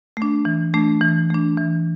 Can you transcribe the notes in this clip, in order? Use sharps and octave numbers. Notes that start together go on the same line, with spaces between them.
A3 D4
E3
A3 D4
E3
A3 D4
E3